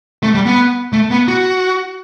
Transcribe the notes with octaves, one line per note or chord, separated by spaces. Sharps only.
A3
G3
B3
A3
B3
F#4